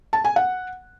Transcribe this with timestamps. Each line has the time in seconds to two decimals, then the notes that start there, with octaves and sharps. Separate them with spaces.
0.13 A5
0.25 G#5
0.36 F#5